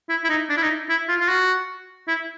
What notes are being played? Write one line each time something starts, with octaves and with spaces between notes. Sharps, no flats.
E4
E4
D#4
D4
E4
D#4
E4
F4
F4
F#4
E4